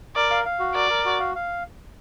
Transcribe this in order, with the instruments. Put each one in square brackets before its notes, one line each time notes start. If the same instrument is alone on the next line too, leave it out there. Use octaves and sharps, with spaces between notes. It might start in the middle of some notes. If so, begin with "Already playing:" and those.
[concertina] A#4 [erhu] D5
[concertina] F5
F5
F#4
[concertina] A#4 [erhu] D5
[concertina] A#4
F#4
F5
F5